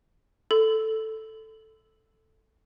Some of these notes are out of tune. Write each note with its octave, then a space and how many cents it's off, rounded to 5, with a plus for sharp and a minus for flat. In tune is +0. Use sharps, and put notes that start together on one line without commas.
A4 +0 C6 -45